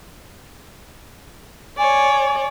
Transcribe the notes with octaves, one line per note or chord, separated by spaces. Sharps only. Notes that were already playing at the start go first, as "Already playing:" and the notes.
C#5 D5 G#5